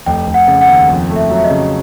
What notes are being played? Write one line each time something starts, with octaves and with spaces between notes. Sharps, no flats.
F1 G5
F1
F#5
C#3
F#5
D#2
F2
A3
E5
F#3
E5
D#5
C#3